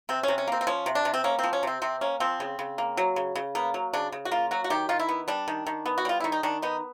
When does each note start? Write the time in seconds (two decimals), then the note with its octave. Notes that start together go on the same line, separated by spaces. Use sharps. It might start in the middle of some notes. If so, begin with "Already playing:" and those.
0.09 C3 C4
0.23 C3 C#4
0.38 C#4
0.48 A#3 C4
0.61 C4
0.67 F3 C#4
0.86 C3
0.95 D4
1.05 C3
1.14 C4
1.24 A#3 C#4
1.39 F3 C4
1.53 C#4
1.63 C3 C4
1.82 C3 C4
2.01 A#3 C#4
2.20 F3 C4
2.40 C#3
2.59 C#3
2.78 A#3
2.97 F#3
3.16 C#3
3.36 C#3
3.55 A#3 B3
3.74 F#3
3.94 C#3 D4
4.12 C#3
4.25 F#4
4.31 A#3 F4
4.51 F#3 F#4
4.64 F#4
4.70 D#3 G4
4.89 D#3 F4
4.99 E4
5.09 B3
5.28 G3 D4
5.48 D#3
5.66 D#3
5.86 B3
5.98 F#4
6.05 G3 F4
6.20 D#3 E4
6.32 D#4
6.43 D#3 D4
6.62 B3 D#4